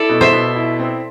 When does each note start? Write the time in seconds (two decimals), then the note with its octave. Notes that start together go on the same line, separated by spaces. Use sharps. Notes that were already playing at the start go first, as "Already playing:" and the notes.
Already playing: E4 A4 D5
0.09 B2
0.21 C5 E5
0.33 B2
0.56 E4
0.80 C4